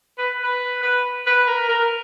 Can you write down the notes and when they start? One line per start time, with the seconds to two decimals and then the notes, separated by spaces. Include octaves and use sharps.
0.18 B4
0.43 B4
0.83 B4
1.27 B4
1.47 A#4
1.69 A#4